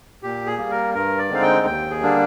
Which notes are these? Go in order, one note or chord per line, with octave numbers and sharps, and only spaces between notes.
A#2 G4
G#4
G3 A#3
A#4
G2 A#4
D5
D3 G#3 C4 D#4 F5
G5
D#2 G5
G#4
D3 G3 A#3 D4